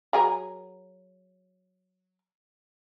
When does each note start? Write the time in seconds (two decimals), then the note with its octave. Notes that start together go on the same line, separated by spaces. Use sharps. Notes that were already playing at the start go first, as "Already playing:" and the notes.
0.13 F#3 G#4 A#4